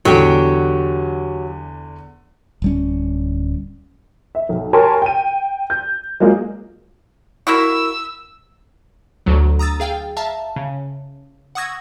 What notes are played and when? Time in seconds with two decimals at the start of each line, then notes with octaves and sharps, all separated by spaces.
0.05 E2 D3 F#3 G4
2.62 D1 G3 C#4
4.35 E5
4.49 B1
4.73 G4 A#4 C#5 G#5 A5 C6
5.02 G5 D#7
5.70 G6
6.20 F#3 G#3 A#3 F4 G#4
7.47 A#3 E4 F#4 E6
9.26 D2 F#3
9.59 A#5 D#6 E6 A6
9.80 G#4 F5 G5
10.17 E5 F5 A5 A#5
10.56 C#3
11.55 F#5 C#6 D#6 E6 G#6 A#6